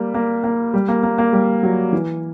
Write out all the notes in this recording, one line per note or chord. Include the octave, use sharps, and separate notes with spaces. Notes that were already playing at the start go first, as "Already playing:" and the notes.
Already playing: G3 A#3
A#3
A#3
G3
A#3
A#3
A#3
G3
F#3
E3